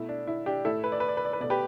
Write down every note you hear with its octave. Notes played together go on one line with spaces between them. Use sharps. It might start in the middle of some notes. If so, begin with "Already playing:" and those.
Already playing: B2 A3 E4
D4
E4
D4 G4
A2 A3 E4 A4
B4
D5
B4
D5
B4
D5
B4
B2 A3 D5
G4 B4